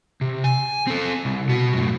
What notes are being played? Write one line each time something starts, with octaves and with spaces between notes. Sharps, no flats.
C3
G#5
C4 A4
C2
B2 F#4
F#2 A2